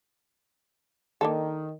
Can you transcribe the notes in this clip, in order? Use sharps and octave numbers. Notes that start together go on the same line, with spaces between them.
D#3 A#3 D4 A4